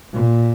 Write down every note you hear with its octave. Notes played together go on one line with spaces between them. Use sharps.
A#2